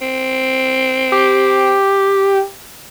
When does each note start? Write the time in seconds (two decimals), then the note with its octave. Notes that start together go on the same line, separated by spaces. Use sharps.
0.01 C4
1.12 G4